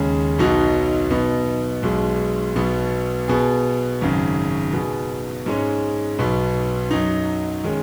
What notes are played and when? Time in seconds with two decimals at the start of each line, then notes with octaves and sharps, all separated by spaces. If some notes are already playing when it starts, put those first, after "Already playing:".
Already playing: D#2 C#3 G#3 C#4
0.38 B1 B2 F#3 D#4 F#4
1.10 B2 B3 D#4
1.83 B1 B2 G#3
2.56 B1 B2 B3
3.28 B2 B3 G#4
4.01 G#1 F#2 C#3
4.73 B2 B3 G#4
5.46 G#2 G#3 C#4
6.18 B1 B2 B3
6.91 F#2 F#3 D#4
7.64 D#3 G#3 C#4